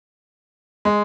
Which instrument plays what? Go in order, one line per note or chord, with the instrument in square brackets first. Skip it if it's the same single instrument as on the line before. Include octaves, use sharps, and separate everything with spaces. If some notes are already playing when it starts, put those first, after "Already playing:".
[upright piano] G#3